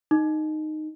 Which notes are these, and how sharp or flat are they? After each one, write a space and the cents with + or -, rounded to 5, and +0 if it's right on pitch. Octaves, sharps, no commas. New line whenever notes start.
D#4 -10